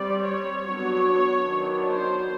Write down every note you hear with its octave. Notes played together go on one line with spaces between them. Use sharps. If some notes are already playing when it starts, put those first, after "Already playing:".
Already playing: G3 C4 D5
C#5
F#3 B3 D4
D#3 F#3 B3 D4
C5